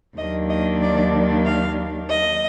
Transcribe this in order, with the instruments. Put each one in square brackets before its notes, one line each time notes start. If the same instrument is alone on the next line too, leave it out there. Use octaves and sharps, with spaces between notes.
[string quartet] D#2 D#3 F#3 A#3 D4 D#5
D#5
D5
F5
D#5